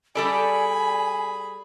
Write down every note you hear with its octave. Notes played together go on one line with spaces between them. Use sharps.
G3 G#4 A4 D5 G#5 B5